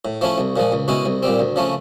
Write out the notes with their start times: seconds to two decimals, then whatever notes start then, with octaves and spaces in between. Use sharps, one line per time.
0.05 A2
0.21 F3 A3 C#4 E4
0.38 C2
0.56 A#2 F3 G#3
0.72 C#2
0.88 B2 G#3 C#4 E4
1.06 C2
1.23 A#2 G3 C4
1.39 D2
1.56 C#3 F3 A3 C#4